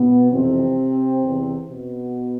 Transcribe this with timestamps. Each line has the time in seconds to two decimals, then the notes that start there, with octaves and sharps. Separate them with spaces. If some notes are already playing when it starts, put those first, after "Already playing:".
Already playing: B2 B3
0.32 F2 C3 E3 C4
1.22 E2 C3 E3
1.68 B2 B3